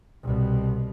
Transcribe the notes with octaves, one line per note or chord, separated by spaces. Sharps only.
C2 B2